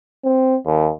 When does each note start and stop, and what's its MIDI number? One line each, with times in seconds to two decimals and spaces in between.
0.25 0.56 60
0.66 0.90 39